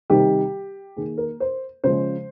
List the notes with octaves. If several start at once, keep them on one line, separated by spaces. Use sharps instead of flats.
C3 D#3 G3 G4
D#3 A#3 G#4
A#4
C5
C#3 F3 G#3 C5